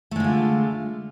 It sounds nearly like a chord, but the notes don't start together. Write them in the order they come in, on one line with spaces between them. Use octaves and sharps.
A3 G#3 D3 F4